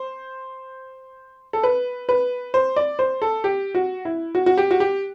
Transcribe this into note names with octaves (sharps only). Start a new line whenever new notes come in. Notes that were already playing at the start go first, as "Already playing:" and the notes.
Already playing: C5
A4
B4
B4
C5
D5
C5
A4
G4
F#4
E4
F#4
F#4
G4
F#4
G4